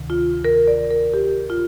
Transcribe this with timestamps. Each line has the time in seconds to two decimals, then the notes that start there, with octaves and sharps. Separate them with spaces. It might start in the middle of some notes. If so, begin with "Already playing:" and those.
Already playing: D2 C3 D#3
0.10 F4
0.44 A#4
0.68 D5
0.91 A#4
1.14 G4
1.50 F4